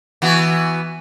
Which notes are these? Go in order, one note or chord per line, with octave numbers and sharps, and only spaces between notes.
E3 B3 F#4